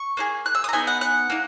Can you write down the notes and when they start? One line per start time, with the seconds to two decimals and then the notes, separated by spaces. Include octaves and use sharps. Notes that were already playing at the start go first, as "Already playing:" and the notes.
Already playing: C#6
0.17 A#3 D#4 G#4
0.46 F#6
0.55 E6
0.64 D#6
0.69 A#5
0.73 B3 D#4 G#4 G#5
0.87 F#5
1.01 F#5
1.30 A#3 D#4